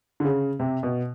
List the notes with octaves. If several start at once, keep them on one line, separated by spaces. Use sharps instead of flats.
D3
C#3
C3
B2